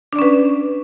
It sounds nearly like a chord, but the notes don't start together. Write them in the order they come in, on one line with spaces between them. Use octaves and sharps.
D4 D5 C#4 B4